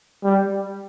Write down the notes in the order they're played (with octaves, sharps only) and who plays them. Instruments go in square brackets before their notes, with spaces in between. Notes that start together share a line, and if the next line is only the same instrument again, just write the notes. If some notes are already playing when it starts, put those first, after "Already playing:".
[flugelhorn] G3